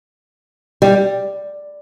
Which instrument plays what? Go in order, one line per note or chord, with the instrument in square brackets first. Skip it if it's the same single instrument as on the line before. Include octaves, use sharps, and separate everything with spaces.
[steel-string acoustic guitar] G3